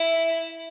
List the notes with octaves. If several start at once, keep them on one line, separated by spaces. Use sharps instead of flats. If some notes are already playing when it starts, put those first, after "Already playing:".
Already playing: E4